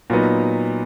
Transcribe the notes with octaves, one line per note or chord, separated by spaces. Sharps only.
A#2 F#3 B3 D#4